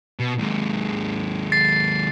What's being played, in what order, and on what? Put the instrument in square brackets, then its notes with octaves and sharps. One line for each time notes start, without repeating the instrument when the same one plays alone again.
[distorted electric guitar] B2
D#2 G#2
[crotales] A6 C7